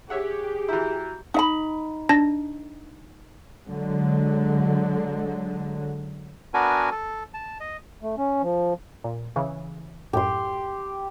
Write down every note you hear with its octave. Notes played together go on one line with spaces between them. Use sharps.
G4 G#4 C#5 E5 F#5
E3 E4 F#4 A#5 G6
D#4 E5 B5
D4 A5 A#6
D3 F#3 G#3
B3 D4 F#4 A#4 B4 G#5
A4
A5
D#5
A3
C#4
F3
A#2
C#3 E3
F#2 A2 G4 C6